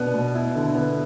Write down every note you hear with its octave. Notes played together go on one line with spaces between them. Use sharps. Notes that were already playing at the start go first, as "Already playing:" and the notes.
Already playing: B2 B3 D4
B2
E4
D3
B3